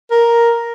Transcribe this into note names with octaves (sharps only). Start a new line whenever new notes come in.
A#4